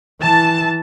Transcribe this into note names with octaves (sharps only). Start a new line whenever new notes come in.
E3 A5